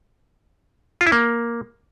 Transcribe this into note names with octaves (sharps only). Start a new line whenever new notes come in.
F4
E4
A#3